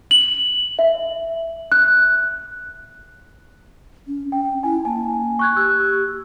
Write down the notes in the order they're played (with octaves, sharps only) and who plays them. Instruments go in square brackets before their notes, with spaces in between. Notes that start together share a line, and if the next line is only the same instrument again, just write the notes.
[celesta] F#7
E5
F#6
[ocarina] C#4
[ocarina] C#4 [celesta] G5
[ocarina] E4 [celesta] G#5
[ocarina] A#3 [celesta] G#5 A5
[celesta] C#6 F#6 G#6
[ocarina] G4 [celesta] E6 F#6